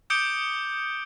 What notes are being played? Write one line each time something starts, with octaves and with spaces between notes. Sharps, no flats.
D6 D#6 G6 C#7 D7 G7